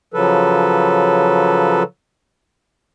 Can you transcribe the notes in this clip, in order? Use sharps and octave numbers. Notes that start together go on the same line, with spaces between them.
C#3 F3 F#3 A4 B4